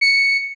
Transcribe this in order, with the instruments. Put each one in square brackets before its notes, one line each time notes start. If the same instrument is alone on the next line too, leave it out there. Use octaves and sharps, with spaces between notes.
[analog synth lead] C#7